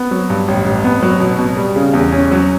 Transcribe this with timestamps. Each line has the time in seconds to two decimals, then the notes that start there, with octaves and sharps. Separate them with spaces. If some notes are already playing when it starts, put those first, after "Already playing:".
Already playing: B3
0.11 F#3
0.30 G2
0.48 A1
0.66 A1
0.84 B3
1.02 F#3
1.20 B2
1.39 B2
1.57 G3
1.76 C#3
1.94 E2
2.12 C#4
2.31 F#3